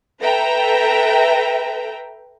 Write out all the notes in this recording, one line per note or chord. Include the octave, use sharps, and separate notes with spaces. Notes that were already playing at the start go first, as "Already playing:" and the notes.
A4 B4 E5 G5 A#5